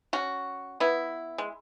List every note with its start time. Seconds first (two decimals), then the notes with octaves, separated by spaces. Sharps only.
0.13 C#4 F#4
0.80 B3 E4
1.38 G#3